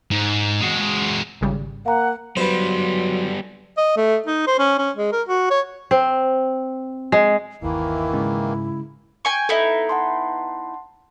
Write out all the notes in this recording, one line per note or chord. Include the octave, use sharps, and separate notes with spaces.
G#2
G#3 F#4
G#1 C#3 G3
A#3 F5 F#5 A#5
F#3 G3 B3 B4 C5
D#5
A3
D#4
C5
C#4
C#4
G#3
A#4
F#4
C#5
C4
G#3
G1 D#2 D#3 E3 A#3 E4
G#2 C#3 G#3
G5 G#5 C#6
B3 D#4 E4 A4 E5
F#5 A5 C6